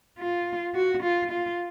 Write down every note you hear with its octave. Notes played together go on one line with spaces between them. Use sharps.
F4
F#4
F4
F4